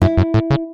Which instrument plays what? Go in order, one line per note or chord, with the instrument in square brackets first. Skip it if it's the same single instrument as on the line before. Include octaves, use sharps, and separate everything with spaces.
[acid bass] F#2 [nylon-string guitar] E4
[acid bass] F#2
A2
C#3